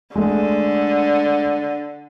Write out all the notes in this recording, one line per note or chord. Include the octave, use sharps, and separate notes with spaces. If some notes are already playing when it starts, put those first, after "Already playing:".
D3 G#3 A3